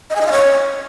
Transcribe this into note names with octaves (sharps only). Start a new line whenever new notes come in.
D#5
G#5
D#5
F5
C#5